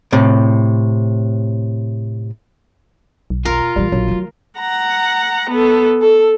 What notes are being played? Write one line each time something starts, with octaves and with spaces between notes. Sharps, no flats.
A2 C3
B1
E1 F4 A#4
A#1 E3 G3
A#1 F#3 E4
D#3 A3
F#5 A#5
B3 A4
A4